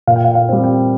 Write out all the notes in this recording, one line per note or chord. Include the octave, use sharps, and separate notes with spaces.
A#2 F5
G5
F5
F5
G3 C4
G5